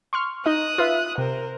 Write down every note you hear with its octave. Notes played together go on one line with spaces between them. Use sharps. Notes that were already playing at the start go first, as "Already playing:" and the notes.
C6 C#6 F6
D#4 D#5 D#6 F#6
F4 B4 E5
C3 A#4 C5